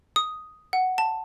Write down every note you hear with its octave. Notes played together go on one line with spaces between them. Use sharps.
D#6
F#5
A5